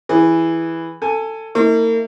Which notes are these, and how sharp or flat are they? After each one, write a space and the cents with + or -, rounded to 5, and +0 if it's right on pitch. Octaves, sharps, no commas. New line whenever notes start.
E3 +0 G#4 +0
A4 +20 G#5 +0
A#3 -40 E4 -45